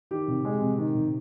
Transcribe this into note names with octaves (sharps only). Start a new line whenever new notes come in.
D#3 G4
C3
G#3
C3
D#3
C3